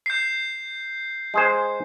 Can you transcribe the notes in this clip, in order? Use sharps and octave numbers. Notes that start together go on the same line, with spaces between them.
G6 C7
G#3 G#4 C5